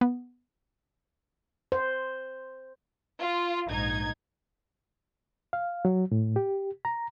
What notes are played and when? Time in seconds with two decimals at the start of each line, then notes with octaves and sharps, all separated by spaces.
0.01 B3
1.72 C5
3.20 F4
3.68 A#1 G#2 D#4 G#6
5.53 F5
5.85 F#3
6.12 A2
6.36 G4
6.85 A#5